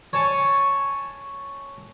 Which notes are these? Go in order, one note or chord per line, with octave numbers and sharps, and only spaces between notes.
C#5 G#5 A5 C#6